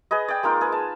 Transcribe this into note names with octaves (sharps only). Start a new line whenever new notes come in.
G#4 B4 D#5
D5 G5
G#3 A#3 D#4 F4
G#4 B4
A5